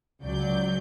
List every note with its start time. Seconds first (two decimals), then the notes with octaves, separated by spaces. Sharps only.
0.21 C#2 F#3 D5 G6